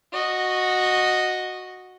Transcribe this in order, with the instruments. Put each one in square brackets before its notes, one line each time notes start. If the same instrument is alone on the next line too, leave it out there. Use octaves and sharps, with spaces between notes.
[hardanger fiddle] F#4 D#5